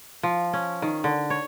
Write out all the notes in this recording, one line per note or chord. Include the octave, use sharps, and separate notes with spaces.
F3
C#4
D#3
D3
C#5